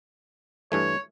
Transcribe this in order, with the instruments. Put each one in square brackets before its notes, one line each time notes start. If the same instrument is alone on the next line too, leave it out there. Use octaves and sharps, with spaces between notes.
[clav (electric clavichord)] G2 E3 A3 [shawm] C#5